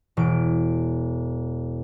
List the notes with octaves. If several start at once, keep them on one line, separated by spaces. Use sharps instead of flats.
E1 D7